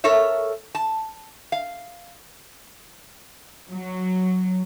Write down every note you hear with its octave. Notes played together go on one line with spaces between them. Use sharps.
A4 A#4 C#5 E5
A5
F5
F#3